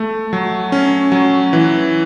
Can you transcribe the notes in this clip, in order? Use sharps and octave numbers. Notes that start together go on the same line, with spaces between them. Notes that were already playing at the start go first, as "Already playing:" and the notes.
Already playing: A3
F#3
C#4
F#3
E3